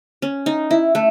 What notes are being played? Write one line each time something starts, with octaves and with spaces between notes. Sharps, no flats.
C#4
D#4
E4
A3